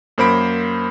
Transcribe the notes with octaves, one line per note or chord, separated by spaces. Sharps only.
F#2 A#3 C5 B5 D7